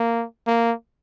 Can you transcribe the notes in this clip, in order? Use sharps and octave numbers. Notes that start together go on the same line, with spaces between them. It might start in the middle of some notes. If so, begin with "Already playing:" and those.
Already playing: A#3
A#3